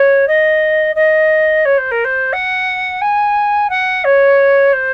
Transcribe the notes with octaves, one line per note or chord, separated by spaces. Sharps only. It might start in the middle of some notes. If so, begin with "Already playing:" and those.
Already playing: C#5
D#5
D#5
C#5
C5
A#4
C5
F#5
G#5
F#5
C#5
C5